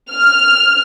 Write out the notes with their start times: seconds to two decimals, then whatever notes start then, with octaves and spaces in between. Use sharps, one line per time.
0.12 F6